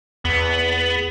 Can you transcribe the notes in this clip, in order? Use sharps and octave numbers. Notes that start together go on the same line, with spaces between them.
E2 B3